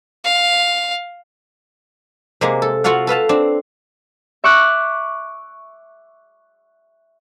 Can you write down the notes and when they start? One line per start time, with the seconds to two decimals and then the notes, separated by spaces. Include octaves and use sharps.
0.24 F5
2.41 C3 G#3 A#3
2.62 A4
2.84 F4 F#4 A4 F5 F#5
3.07 A4 B4 F5 A5
3.29 C4 D4
4.44 E5 C#6 D6 F#6